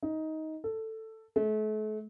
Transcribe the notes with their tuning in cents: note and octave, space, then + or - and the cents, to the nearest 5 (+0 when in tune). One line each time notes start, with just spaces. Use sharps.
D#4 +15
A4 +10
A3 -40